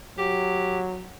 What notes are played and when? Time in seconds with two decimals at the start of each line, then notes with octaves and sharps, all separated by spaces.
0.18 F#3 G4